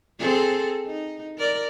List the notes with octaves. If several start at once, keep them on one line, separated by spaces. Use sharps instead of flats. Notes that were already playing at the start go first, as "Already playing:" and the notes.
C4 G#4 A4
D#4
A#4 D5